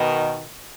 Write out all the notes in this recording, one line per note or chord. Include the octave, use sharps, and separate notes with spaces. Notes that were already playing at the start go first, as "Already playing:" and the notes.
Already playing: B2 D#3